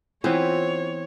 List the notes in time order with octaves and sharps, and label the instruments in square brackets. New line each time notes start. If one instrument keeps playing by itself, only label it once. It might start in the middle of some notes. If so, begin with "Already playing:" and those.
[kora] E3 B3 F5 [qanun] C4 [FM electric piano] F4 [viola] C#5